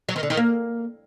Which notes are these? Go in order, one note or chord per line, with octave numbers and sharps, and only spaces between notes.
F#3
D#3
D3
D#3
A#3